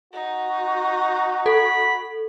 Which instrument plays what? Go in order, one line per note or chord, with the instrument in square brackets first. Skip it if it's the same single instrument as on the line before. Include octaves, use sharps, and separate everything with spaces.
[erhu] D#4 [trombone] F#4
[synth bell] A4 [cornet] B5